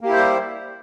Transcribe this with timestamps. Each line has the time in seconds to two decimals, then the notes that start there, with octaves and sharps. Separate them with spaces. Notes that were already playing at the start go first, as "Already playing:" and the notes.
0.01 A#3
0.05 G4
0.09 E4
0.13 C5
0.17 G3